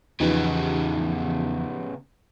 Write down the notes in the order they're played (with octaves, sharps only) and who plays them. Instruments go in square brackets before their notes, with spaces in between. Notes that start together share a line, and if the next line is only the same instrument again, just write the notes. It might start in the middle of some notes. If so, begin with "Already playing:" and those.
[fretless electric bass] E2 [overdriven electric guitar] C#3 B3 [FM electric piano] F3 D#4 G4